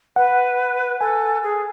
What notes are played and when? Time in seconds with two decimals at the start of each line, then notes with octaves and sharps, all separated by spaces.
0.16 B4 F#5
1.00 A4 G#5
1.43 G#4